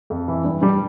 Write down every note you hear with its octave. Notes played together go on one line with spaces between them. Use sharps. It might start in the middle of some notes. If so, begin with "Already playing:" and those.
F2
E3
G2
G2 G3